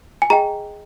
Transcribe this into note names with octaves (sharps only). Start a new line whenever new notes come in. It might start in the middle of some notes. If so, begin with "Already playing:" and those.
G#5
G#4 D#5 G5 A#5